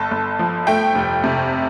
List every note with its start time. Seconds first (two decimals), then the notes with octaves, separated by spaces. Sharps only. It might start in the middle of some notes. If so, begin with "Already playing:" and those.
Already playing: G1 A4
0.11 G1
0.39 F3
0.67 A3 G5
0.95 F1
1.24 C3